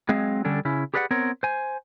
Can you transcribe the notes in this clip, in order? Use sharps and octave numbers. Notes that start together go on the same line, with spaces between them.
F#3 G#3 C4 G#4 D#5 F5
D3 G3 C#4 D4 A4
C#3 C#4 E4
G4 G#4 B4 D5 F5 F#5
B3 C4 A#4 C#5
C5 G#5